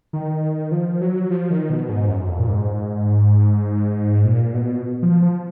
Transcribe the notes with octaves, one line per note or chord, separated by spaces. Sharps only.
D#3
F3
F#3
F3
D#3
B2
G#2
F#2
F2
A#2
G#2
A#2
B2
F3
F3